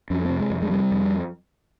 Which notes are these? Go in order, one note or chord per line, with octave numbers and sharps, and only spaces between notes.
F2 C#4
C3 C4
G#3
F2
G#3
C3 G3
F2